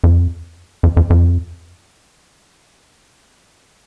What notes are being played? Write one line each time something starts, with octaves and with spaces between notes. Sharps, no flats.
F2
F2
F2
F2